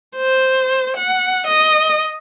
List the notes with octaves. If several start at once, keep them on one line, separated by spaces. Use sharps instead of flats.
C5
F#5
D#5